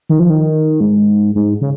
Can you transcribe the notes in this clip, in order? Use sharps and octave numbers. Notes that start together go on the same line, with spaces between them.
D#3
F3
D#3
G#2
G#2
C#3